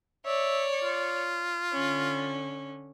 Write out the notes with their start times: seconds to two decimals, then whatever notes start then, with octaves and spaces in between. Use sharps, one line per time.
0.26 C#5 D5 E5
0.84 F4
1.72 D3 C#4